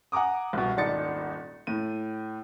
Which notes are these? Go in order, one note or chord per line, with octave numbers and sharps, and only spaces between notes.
F#5 G#5 A#5 D6 D#6
C2 B2
D#1 G#1 D4 D#4 A6 C#7
A2 D#7